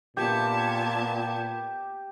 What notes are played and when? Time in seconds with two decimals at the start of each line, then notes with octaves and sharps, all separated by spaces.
0.17 A#2 B3 G4 A5 G#6